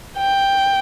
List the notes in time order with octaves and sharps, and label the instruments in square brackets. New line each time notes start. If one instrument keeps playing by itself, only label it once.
[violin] G5